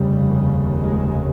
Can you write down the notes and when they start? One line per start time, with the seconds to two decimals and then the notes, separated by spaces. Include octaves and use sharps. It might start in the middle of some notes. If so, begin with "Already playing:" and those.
Already playing: F1 D#2 C#3 G3
0.81 G#3